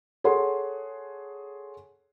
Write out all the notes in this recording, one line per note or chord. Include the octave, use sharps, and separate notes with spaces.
G#4 A4 C#5 F#5 C6